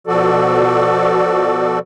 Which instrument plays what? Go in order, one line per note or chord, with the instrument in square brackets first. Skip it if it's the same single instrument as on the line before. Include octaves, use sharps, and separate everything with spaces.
[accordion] B2 F3 F#4 A4 D5